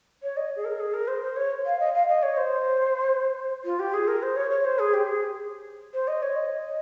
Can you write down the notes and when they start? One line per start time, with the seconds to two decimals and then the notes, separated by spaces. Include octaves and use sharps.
0.22 C#5
0.36 D#5
0.56 G#4
0.64 A#4
0.79 G#4
0.93 A#4
1.07 C5
1.22 C5
1.36 C#5
1.65 F5
1.79 D#5
1.93 F5
2.07 D#5
2.22 C#5
2.37 C5
3.64 F4
3.79 G4
3.93 G#4
4.07 A#4
4.22 C5
4.36 C#5
4.50 C#5
4.64 C5
4.78 G#4
4.93 G4
5.07 G#4
5.93 C5
6.07 D#5
6.22 C#5
6.36 D#5